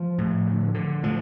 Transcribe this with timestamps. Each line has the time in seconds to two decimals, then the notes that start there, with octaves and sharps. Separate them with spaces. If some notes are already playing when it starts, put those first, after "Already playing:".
Already playing: F3
0.18 A2
0.47 D3
0.74 D3
1.03 A2 F3